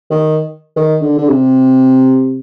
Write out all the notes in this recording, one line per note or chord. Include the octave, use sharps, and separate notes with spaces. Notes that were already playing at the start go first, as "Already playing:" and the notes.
D#3
D#3
D3
D3
C3